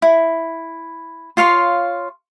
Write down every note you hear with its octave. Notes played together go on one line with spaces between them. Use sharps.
E4
F4 C#5 F5 C6